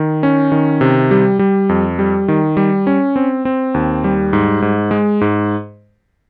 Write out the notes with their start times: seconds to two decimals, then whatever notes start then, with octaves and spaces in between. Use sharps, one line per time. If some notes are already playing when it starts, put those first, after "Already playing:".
Already playing: D#3
0.23 C#4
0.52 D#3
0.81 C3
1.11 G3
1.39 G3
1.69 F2
1.99 G3
2.28 D#3
2.57 G3
2.87 C#4
3.16 C4
3.45 C4
3.74 D#2
4.04 G3
4.33 G#2
4.62 G#2
4.91 G#3
5.21 G#2